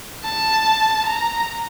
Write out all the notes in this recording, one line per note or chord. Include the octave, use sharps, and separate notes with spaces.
A5
A#5